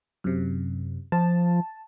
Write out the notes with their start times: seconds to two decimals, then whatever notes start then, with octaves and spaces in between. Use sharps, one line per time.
0.24 F#2 C3
1.12 F3 A5